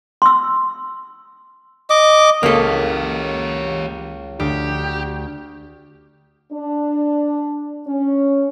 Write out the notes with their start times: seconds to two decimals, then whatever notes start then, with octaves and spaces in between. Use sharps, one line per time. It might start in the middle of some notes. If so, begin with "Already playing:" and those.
0.22 C6 E6
1.90 D#5 D6
2.43 C#2 A#3 G4 A4 C#5 B6
4.40 D2 G4
6.52 D4
7.87 C#4